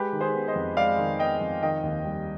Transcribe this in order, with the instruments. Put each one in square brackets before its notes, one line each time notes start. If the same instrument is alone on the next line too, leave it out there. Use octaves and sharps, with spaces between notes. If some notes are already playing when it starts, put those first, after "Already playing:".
Already playing: [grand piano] G#3 G4 B4
D#3
G#4 C5
B3
C5 D#5
F2
G#3 D5 F5
D#3
B3 D#5 G5
F2
D#3 D#5 G5
D#2
G3